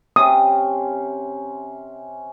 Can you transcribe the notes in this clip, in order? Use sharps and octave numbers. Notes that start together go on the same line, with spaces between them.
C3 C#4 D#6